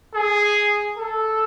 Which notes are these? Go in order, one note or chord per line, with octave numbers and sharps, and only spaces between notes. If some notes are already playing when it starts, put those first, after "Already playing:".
G#4
A4